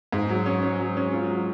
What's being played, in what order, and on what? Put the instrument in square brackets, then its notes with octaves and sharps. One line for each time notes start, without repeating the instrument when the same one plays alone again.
[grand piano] G#2
F#3
C#4
C#4
F#3
C#4
F4
F#3